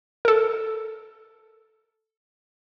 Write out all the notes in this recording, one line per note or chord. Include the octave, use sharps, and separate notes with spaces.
A4 A#4